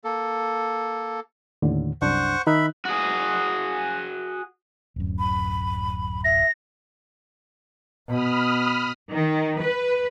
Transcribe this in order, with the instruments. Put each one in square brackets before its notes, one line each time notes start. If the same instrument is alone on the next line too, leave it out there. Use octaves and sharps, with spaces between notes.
[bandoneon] A#3 A4
[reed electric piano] D#2 A2 D3
[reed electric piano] C2 F#2 D4 [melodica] C5 F#5 C#6
[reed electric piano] D#3 D#4 F#6 [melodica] E5 B5
[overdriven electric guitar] F#4 G#4
[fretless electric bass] D1 F#2
[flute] B5
[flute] E5 [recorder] A#6
[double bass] B2 [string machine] B5 D#6 F6
[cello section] D#3
B4